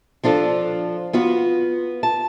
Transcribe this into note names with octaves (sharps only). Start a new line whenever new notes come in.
F3 D4 F4 A4
B3 F4 F#4
A5